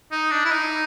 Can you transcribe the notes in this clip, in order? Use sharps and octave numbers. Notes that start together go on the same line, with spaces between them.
D#4
D4
E4
D#4